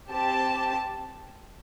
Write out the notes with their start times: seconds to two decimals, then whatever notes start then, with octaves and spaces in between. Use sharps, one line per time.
0.11 C4 G4 A5